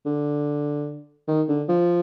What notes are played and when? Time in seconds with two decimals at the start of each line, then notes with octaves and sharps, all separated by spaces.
0.06 D3
1.28 D#3
1.48 D3
1.69 F3